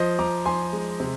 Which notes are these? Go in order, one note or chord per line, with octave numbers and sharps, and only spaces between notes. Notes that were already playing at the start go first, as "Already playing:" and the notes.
Already playing: F3 C5 D#5
F3 A#5 D6
F3 G#5 C6
G#3
C3